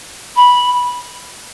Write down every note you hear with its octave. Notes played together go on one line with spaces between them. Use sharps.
B5